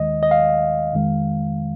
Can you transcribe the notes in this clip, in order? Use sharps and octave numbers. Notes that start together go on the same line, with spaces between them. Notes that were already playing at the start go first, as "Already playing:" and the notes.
Already playing: D#2 D#3 G#3 D#5
D#5
F5
F2 D#3 G#3